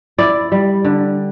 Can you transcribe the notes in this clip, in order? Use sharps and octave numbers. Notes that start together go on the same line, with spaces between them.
E4 D5
G3
D3